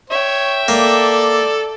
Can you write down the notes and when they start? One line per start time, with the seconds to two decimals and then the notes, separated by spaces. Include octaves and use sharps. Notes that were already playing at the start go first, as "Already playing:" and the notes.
0.10 C#5 E5 G5
0.68 A#3 A4 D5